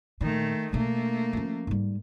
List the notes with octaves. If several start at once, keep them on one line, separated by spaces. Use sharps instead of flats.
A#2 D#3 A3
B2 A3 A#3 D4
F3 C#4
G#2 G3